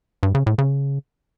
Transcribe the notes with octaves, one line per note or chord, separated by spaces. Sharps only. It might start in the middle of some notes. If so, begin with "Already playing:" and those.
G2
C#3
A2
C#3